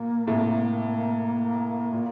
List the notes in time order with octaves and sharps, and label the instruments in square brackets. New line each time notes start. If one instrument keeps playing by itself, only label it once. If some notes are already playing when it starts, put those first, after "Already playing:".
Already playing: [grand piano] A#2 [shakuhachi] A#3
[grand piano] A2 C3
A#2